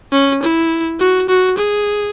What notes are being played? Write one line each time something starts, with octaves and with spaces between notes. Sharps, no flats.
C#4
E4
F#4
F#4
G#4